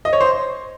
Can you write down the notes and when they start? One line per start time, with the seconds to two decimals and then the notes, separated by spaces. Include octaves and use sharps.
0.05 D#5
0.13 C#5
0.21 C5